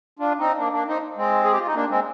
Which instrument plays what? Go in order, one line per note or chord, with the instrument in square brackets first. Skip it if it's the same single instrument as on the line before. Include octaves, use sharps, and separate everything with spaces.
[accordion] D4 F4
C4 D#4
A#3 D4
A#3 D4
C4 D#4
G#3 C4
G#4
G4
F4
D#4
A#3 D4
G#3 C4